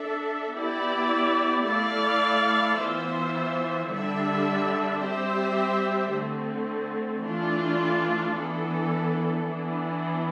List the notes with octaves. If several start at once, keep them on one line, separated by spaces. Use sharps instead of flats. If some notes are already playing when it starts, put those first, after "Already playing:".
Already playing: D4 A4 E5
B3 E4 G4 D5
A3 E4 A4 D5 F5
E3 B3 F4 C5 E5
D3 G3 D4 A4 E5
G3 C4 G4 C5 E5
D3 A3 C4
E3 A3 D4 F4
E3 B3 D4 A4
E3 B3 D4